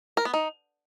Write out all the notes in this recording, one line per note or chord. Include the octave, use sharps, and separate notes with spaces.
A#4
B3
D#4